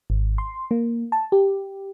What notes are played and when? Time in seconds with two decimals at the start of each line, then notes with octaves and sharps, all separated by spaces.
0.10 G#1
0.38 C6
0.71 A#3
1.12 A5
1.32 G4